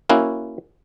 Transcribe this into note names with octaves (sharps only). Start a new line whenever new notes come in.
A#3 C#4 E4 F#4